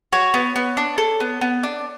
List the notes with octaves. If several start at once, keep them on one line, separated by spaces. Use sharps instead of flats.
F#4 C#5
B3
B3
D4
A4
B3
B3
D4